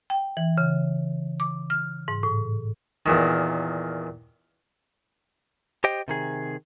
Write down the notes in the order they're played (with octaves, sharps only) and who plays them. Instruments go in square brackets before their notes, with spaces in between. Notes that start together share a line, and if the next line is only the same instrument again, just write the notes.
[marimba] G5
E3
C#3
D6
F6
G#2
A2
[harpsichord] E2 A#2 D#3
[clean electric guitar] G4 C5 D#5 G5
C3 D#3 G#4